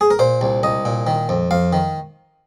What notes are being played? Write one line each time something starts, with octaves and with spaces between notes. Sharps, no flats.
G#4
A#4
A#2 C5
C2
C2 D#5
A#2
D#3
F2
F2 F5
D#3